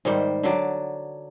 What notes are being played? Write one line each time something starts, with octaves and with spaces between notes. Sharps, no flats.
G#2 D#3 G3 C5
D3 F#3 D5